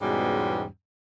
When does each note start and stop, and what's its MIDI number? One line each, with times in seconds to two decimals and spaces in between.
0.01 0.65 40
0.01 0.65 44
0.01 0.65 47
0.01 0.65 55
0.01 0.65 56
0.01 0.65 61